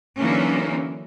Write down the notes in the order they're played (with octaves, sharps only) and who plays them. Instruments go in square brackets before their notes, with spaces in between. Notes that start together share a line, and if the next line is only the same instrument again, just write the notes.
[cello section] D3 E3 F#3 A#3 C#4 D#4